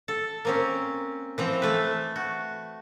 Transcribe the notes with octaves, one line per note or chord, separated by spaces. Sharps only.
A4
A#3 C4 C#4
E3 F3 C4
E3 A3 B4
F#4